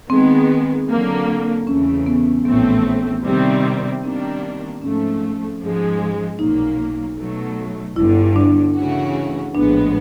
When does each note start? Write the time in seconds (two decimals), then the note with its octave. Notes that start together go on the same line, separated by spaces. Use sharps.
0.09 D#3 G#3 B3 C4
0.88 D3 F#3 A#3
1.67 E2 C#3 E3 A3 C#4
2.06 B3
2.45 A#1 A2 E3 A3 B3 C4
3.24 C3 D#3 G3 C4
4.03 D#3 G3 A#3 C4 D4
4.82 G#2 F3 A3 C#4
5.61 G#2 F3 G#3
6.39 B1 A#2 F#3 A#3 D#4
7.18 B2 F#3 A3
7.96 G1 G2 D3 E4
8.36 D4
8.75 C#3 E3 A3 C#4 F#4
9.55 A#1 A2 F3 G#3 B3 D4